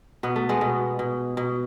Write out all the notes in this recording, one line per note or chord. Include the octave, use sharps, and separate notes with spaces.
B2 B3
A3
G#3 B3
B2
B2
B2